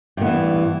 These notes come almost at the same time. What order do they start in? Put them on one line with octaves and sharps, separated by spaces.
G2 B3 E3